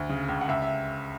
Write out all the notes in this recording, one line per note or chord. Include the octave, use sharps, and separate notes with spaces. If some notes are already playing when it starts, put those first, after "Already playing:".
Already playing: D2
C#3
C#2
F#5
C#2 E5
E5